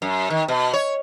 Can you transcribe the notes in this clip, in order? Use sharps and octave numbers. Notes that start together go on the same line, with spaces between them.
F#2
D#3
B2
C#5